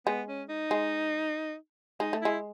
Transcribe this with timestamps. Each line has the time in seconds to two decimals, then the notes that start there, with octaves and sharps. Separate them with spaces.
0.07 G#3 B3
0.28 C#4
0.49 D#4
0.71 G#3
2.00 G#3 D#4
2.13 A3
2.22 G#3 E4